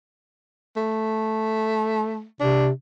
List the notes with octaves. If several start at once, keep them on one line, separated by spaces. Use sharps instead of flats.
A3
C3 D4